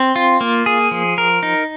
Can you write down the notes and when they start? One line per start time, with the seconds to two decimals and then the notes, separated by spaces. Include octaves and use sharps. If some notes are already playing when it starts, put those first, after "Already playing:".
Already playing: C4
0.16 F4
0.41 A#3
0.66 G#4
0.91 F3
1.18 A#4
1.43 D#4